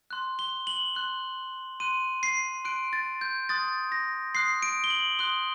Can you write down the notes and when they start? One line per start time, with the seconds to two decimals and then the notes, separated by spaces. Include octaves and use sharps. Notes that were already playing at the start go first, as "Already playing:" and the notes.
0.11 C6 F#6
0.39 G7
0.67 F#7
0.95 C6 F#6
1.80 C6 F#6 D#7
2.23 C7
2.64 C6 F#6 D7
2.93 A6
3.21 G6
3.49 C6 D#6 F#6 A6
3.92 A#6
4.34 C6 D#6 F#6 C7
4.62 D7
4.84 G7
4.90 F#7
5.19 C6 D#6 F#6 G7